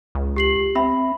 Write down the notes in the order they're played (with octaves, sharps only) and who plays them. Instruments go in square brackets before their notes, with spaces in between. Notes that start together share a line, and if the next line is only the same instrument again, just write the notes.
[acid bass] C#2
[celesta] G4 C7 F#7
[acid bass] C4 [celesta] E5 B5